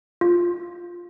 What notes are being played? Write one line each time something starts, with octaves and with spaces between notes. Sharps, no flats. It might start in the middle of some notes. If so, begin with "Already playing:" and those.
F4